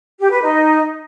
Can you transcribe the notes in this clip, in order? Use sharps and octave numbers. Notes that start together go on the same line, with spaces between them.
G4
B4
D#4